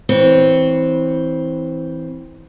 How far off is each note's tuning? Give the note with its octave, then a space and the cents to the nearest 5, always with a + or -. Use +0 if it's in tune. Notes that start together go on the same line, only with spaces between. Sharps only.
E3 -20 C4 +0 C#5 +0